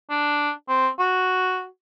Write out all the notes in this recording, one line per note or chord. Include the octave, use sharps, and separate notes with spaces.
D4
C4
F#4